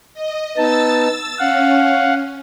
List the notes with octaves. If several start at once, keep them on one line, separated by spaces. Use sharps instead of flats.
D#5
B3 D#4 A5 E6 A6
C#4 F5 F#5